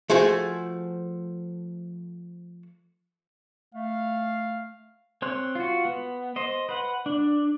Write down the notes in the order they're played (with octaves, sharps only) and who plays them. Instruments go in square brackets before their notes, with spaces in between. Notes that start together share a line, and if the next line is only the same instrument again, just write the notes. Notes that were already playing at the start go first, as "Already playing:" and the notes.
[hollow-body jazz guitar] F3 A3 F#4 G#4 C5
[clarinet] A3 [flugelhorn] F5
[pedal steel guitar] C4 C#5 C6 F#6
F4 F#4
B3
C5 D#5
B4 F#5
D4